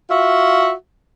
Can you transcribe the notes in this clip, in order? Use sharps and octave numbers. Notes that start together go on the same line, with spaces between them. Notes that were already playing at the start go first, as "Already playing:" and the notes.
F4 F#4 E5